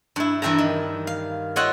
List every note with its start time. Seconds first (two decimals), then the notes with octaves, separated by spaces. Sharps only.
0.16 G2 E4
0.42 G2 E3 E5 G5 A5 A#5
0.58 D#3
1.07 F5
1.56 F4 C#5 D#5 E5 F#5 G5